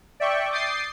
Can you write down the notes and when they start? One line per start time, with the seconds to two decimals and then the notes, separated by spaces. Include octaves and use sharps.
0.20 D5 E5 G5 C#6
0.52 D6 D#6 G6 A6 C7